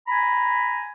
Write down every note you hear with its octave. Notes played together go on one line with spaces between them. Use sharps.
G#5 A#5 B5